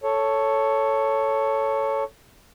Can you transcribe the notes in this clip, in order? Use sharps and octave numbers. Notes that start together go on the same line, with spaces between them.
A4 C#5